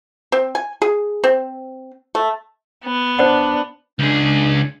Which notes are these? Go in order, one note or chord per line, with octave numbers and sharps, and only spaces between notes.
C4
G#5
G#4
C4
A3
B3
D4 C5 D5 F#5
C#2 D4 G#4